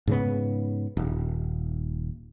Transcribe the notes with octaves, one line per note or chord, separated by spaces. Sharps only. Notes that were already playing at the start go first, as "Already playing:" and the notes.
G#2 C#3 B3
D#1